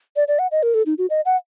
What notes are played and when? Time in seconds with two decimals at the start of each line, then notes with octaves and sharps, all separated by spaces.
0.16 D5
0.28 D5
0.39 F#5
0.51 D#5
0.63 A#4
0.74 A4
0.86 D#4
0.98 F#4
1.10 D#5
1.25 F#5